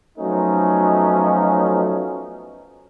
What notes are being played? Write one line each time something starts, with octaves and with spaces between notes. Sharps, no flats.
F3 F#3 A3 B3 C#4 D#4